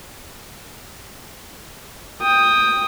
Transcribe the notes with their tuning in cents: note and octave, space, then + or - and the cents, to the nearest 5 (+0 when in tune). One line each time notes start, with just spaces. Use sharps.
G5 +15 D#6 +0